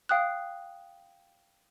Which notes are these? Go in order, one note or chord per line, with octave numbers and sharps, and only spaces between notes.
F5 G5 D#6 F#6